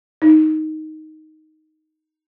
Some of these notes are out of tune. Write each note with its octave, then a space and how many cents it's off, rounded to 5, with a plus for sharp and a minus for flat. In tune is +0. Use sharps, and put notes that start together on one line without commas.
D#4 +5